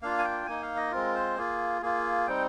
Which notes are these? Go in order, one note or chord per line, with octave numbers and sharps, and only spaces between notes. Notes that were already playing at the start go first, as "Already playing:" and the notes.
A#3 D4 F4 F5
G#5
G5
A#3 D#4 G#5
F5
D#5
G#3 C4 F4 A#4
C5
A#3 F4 G#4
A#3 F4 G#4
G3 C4 D#4 G5